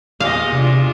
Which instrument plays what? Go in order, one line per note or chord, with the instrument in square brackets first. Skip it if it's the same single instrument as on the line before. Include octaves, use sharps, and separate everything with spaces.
[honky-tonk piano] E2 A#2 [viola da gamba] G4 D#5 [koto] F5
[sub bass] C3 [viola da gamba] D4 F4